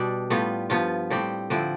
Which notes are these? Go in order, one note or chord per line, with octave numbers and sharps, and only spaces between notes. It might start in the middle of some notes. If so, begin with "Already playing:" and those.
Already playing: B2 G3 D4
A2 G3 B3 F4
G2 F3 B3 F4
A2 G3 C4 G4
D3 F3 C4 E4